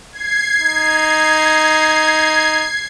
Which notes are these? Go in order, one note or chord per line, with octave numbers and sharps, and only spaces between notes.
G#6 C7
D#4